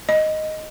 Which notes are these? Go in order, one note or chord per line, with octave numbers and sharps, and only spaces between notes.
D#5